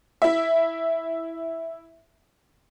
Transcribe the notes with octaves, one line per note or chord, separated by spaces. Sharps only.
E4 E5